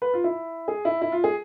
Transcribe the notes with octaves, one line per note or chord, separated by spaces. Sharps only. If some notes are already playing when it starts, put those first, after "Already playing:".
B4
F4
E4
G#4
E4
E4
F4
G#4